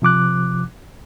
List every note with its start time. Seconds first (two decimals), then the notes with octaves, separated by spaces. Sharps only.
0.02 C3 F3 D6 F#6